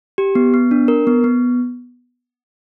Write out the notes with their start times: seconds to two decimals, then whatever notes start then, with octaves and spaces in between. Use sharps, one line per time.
0.18 G4
0.35 B3
0.54 B3
0.71 D4
0.88 A#4
1.07 B3
1.24 B3